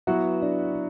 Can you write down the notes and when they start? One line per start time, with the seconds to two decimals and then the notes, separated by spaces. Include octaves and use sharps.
0.07 F#3 B3 E4 F#4 B4 E5
0.42 D4 D5